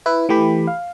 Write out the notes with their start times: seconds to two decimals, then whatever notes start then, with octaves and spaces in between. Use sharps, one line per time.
0.06 E4 B4
0.29 E3 A3 G4 B5
0.67 F5